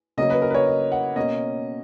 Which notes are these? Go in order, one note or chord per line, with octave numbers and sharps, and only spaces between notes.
C#3 F#3 A#3 C#4 D#5
B4
A#4
B4
C#5
D#5
F#5
B2 A#3 C#4 D#5